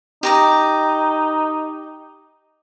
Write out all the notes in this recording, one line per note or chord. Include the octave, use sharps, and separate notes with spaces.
D#4 G4 A#5 D#6